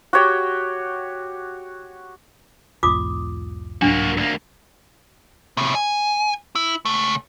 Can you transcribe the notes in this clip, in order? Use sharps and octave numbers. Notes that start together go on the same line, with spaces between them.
F#4 G4 C#5 G5
B1 E2 G#2 F4 D6 D#6
C2 G#2 F#3 A#3 D4 F#4
D2 A#3
A2 C3
G#5
E4
C#2 A3